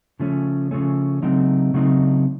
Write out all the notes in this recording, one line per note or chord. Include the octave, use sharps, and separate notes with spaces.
C#3 F3 A3 C#4
C#3 F3 A3 C#4
C#3 F#3 A3 C4 D#4
C#3 F#3 A3 C4 D#4